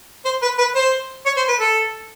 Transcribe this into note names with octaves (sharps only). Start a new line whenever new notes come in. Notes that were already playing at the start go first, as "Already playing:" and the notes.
C5
B4
B4
C5
C#5
C5
B4
A4